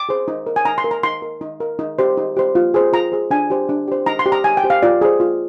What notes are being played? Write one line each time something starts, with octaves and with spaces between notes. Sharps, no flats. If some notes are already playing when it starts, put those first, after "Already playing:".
Already playing: D6
G#4 C5
D#4
A#4
G#5
D#4 A#5
C6
A#4
A#5
D#4 C6
A#4
D#4
A#4
D#4
G4 C5
D#4
G4 C5
F4
G#4 C5
F4 A#5
G#4 C5
D4 G#5
G4 C5
D4
G4 C5
D#4 A#5
C6
G4 C5
A#5
D#4 G#5
G5
G4 C5
F5
F4 D5
G#4 C5
F4